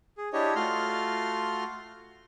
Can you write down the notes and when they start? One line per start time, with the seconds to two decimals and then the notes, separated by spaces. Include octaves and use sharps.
0.18 G#4
0.33 D4 E4 G4 C#5 D#5
0.56 A3 F4 F#4 C6 F6